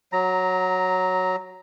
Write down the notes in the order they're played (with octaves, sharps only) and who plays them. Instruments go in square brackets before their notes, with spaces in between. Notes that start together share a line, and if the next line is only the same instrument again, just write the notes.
[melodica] F#3 A#5